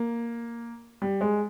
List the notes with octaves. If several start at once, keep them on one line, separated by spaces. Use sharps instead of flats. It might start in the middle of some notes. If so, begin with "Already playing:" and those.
Already playing: A#3
G3
G#3